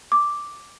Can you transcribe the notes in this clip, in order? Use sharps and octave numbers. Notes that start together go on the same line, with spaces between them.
D6